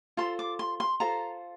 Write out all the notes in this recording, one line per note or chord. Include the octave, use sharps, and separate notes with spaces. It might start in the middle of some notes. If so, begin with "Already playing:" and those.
F4 A4 C5 C6
D6
C6
C6
F4 A4 C5 A#5